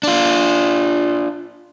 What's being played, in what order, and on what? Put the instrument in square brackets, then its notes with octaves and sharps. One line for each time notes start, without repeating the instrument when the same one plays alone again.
[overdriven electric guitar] D4 F4